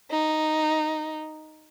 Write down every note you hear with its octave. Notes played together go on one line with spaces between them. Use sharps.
D#4